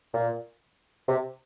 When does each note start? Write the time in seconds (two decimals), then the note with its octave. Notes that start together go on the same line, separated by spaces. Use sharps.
0.13 A#2
1.08 C3